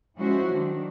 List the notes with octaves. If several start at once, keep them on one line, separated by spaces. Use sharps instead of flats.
F3 G#3 C#4 E4 F#4 C5
D#3 F#3 D4